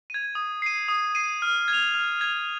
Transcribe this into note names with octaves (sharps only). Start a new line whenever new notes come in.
G#6 D#7
D#6
C7 D#7
D#6
C7 D#7
F6
G#6
F7
F6
G#6 F7